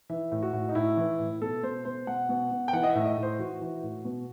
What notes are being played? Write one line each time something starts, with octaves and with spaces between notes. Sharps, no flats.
E3 E5
A2
F#4
A2
D#4
A2 E4
E3
A2
B2 A4
B2 C5
B2 C5
B2 F#5
B2
B2
G5
E3 F#5
D#5
E5
A2
D#5
A2
C5
E3 F#4
E3
A2
B2